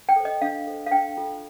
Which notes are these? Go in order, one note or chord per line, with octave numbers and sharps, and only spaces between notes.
G5
A4 C5
D#5
D4 F5
A4 C5
F5
D4 G5
F4 A4